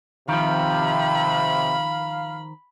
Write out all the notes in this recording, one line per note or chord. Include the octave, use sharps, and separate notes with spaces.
C3 D#3 F3 F5 B5